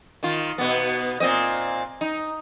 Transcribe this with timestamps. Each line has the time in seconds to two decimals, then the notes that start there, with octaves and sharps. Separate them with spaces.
0.23 D#3 F4
0.58 B2 B3
1.20 A#2 C4 D#5
2.01 D#4